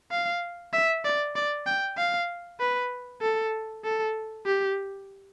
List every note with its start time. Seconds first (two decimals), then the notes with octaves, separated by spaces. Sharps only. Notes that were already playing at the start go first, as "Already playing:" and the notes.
0.11 F5
0.73 E5
1.04 D5
1.36 D5
1.67 G5
1.98 F5
2.60 B4
3.22 A4
3.84 A4
4.46 G4